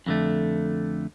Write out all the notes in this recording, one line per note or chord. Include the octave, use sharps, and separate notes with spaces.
F2 D3 A3